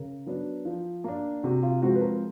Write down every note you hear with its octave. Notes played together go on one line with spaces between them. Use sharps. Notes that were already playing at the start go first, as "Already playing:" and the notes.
Already playing: C#3 A#4
F#3 B3 D4
F3
A#3 D4
C3 F#4
F4
F3 G#3 C4 F#4
B4
A#4